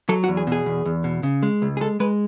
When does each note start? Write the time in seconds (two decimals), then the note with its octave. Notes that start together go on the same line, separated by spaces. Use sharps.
0.09 F#3 A4
0.24 F#4
0.28 E2
0.37 G#4
0.47 B2
0.52 G#4
0.66 E2
0.85 E2
1.04 B2
1.23 C#3
1.43 G#3
1.62 C#2
1.77 G#4
1.81 G#3 A4
2.00 G#3 B4